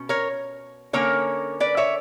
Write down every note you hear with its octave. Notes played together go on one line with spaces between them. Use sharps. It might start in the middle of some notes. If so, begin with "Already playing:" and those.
Already playing: B2 C#4
A#4 C#5
D3 A#3 C#4 A#4 C#5
B4 D5
C#5 E5